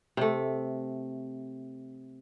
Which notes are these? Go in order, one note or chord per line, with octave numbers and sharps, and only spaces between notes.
C3 A3